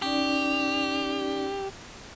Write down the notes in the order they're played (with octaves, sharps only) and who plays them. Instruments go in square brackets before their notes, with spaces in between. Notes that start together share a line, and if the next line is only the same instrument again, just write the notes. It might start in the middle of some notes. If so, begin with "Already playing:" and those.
[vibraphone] C#4 D#4 D5 [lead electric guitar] G4